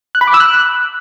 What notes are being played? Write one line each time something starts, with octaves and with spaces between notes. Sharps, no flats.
F#6
B5
D6
E6
F#6